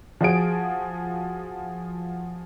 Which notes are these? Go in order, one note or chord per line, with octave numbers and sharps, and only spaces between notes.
F3 F#4 G#4 D7